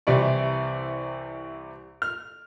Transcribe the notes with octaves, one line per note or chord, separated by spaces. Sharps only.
C2 C3 E3 E4 D5 C#6
F6